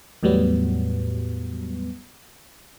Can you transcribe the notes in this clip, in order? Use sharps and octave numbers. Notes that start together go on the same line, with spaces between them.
E2 A2 F#3 G3 B3